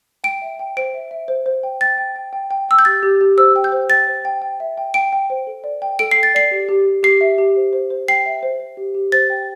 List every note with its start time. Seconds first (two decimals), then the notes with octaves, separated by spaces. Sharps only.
0.24 G5 D7
0.42 E5
0.59 G5
0.77 C5 D7
0.94 E5
1.11 E5
1.28 C5
1.46 C5
1.63 G5
1.81 G5 A6
1.98 G5
2.16 G5
2.33 G5
2.51 G5
2.69 G5 E6
2.79 G6
2.85 G4 A6
3.03 G4
3.21 G4
3.37 C5 E6
3.56 G5
3.64 G6
3.72 C5
3.90 G5 A6
4.07 C5
4.25 G5
4.42 G5
4.60 E5
4.77 G5
4.94 G5 D7
5.13 G5
5.30 C5
5.47 A4
5.64 D5
5.82 G5
5.99 A4 D7
6.11 G5 C7
6.23 A6
6.34 D5 C7
6.51 G4
6.69 G4
6.86 G4
7.03 G4 C7
7.21 E5
7.38 G4
7.56 C5
7.73 C5
7.90 C5
8.08 G5 C7
8.26 E5
8.43 C5
8.60 C5
8.77 G4
8.95 G4
9.12 C5 A6
9.30 G5